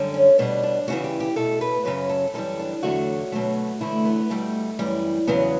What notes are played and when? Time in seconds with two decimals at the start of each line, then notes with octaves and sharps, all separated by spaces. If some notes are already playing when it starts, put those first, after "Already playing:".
Already playing: F#2 D3 G3
0.14 C#4
0.39 B2 G3 D4
0.63 D4
0.88 E2 C#3 E3 F#4
1.04 G4
1.20 G4
1.36 B2 A3 A4
1.61 B4
1.85 F#2 C#3 F#3 B4
2.09 A4
2.34 F#2 E3 G3 A4
2.60 D4
2.83 E2 D3 F#3 A3 F#4
3.32 B2 F#3 A3
3.81 E2 D3 A3 E4
4.05 B3
4.30 B2 G3 A3
4.79 F#2 E3 G3
5.27 E2 C#3 F#3 B3